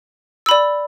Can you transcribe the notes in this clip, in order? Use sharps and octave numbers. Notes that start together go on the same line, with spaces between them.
D5 B5 E6